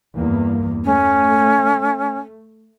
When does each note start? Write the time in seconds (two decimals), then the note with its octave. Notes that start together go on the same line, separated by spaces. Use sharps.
0.16 E2 G2 A#3
0.85 A3 C#4